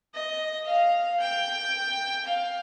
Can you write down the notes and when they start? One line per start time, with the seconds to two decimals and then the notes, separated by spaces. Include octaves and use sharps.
0.14 D#5
0.67 F5
1.20 G5
2.25 F5